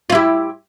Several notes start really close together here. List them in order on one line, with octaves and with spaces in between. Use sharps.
F4 E4 G4